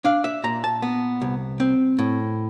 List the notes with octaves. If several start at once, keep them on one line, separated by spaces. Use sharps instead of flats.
D4 F5
E5
A#2 A#5
A5
B3
C2
C4
A2